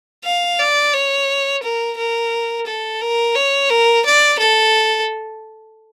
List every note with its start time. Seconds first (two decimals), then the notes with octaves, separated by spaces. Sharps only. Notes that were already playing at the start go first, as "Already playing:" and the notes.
0.24 F5
0.59 D5
0.94 C#5
1.63 A#4
1.97 A#4
2.66 A4
3.01 A#4
3.35 C#5
3.70 A#4
4.05 D5
4.39 A4